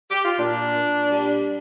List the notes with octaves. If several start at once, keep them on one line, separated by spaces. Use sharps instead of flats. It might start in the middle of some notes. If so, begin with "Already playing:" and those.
G4
F4
A#2 D4
A#2
G3